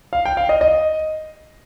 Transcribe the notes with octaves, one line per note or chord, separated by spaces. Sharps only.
F5
G5
F5
D#5
D#5